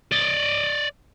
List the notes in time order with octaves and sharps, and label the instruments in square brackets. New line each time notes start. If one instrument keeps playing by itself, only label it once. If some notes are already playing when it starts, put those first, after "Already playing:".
[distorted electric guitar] D5 D#5